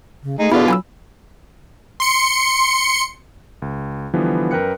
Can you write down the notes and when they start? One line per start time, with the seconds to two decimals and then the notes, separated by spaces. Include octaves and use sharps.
0.23 C#3
0.39 A3 D#4 G#4
0.52 B2 D3 E3 E4 F4 G#4 D5
0.68 F#3 G#5 B5 E6
2.00 C6 C#7
3.62 C#2
4.13 D3 E3 F3 G3 B3
4.51 F#2 A#4 B4 G5 F#6 C#7